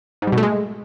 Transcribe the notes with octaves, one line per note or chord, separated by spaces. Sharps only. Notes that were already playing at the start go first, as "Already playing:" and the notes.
G#2
G3
B2
A3
G#3